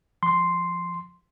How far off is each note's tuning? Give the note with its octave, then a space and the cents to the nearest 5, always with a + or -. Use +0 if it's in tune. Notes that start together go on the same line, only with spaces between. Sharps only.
F3 +0 C6 +0